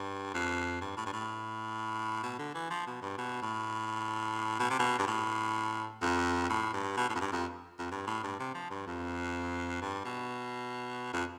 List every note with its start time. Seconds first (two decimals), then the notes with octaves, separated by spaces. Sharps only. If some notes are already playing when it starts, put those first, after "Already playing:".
Already playing: G2
0.34 F2
0.81 G2
0.97 A2
1.06 G2
1.13 A2
2.23 B2
2.39 D3
2.54 E3
2.70 F3
2.87 B2
3.02 G2
3.18 B2
3.42 A2
4.59 B2
4.70 C3
4.79 B2
4.99 G2
5.07 A2
6.02 F2
6.50 A2
6.73 G2
6.97 B2
7.09 A2
7.15 F2
7.21 G2
7.33 F2
7.79 F2
7.92 G2
8.07 A2
8.23 G2
8.40 C3
8.54 F3
8.70 G2
8.87 F2
9.82 G2
10.05 B2
11.13 F2